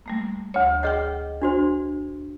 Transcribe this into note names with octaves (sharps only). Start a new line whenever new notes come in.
G3 A3 A#3
D2 C#5
G#4 D#5 F#5 G5 F6 G6
D4 F#4 C5